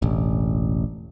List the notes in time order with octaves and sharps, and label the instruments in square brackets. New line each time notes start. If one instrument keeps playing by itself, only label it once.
[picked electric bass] E1 A1